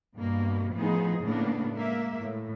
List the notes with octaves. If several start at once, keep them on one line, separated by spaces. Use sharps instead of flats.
G2 B2 A#3
A2 F3 B3 D#4 G#4
A2 C#3 A#3 B3 D4
G#3 A#3 E5
A2